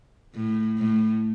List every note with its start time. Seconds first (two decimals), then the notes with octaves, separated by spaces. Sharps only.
0.35 A2
0.78 A2